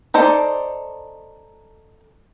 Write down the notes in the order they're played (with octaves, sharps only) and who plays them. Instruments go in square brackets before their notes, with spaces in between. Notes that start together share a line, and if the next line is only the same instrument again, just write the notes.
[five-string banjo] D#4 A4 C5 D5